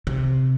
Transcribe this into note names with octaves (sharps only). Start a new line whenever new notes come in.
C3